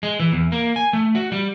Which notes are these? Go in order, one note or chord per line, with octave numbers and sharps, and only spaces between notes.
G#3
E3
E2
A#3
G#5
A3
F#4
G3